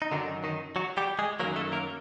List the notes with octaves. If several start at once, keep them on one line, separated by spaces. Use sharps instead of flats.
D#4
F#2 D3 D#3 F#3 D4
D#3 D#4
F#3 F#4
G3 G4
G#3 G#4
F#2 D#3 F#3 A#3 A#4
A3 A4
A#3 A#4